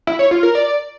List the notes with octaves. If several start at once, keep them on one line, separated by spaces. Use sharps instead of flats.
E4
C#5
F4
A#4
D5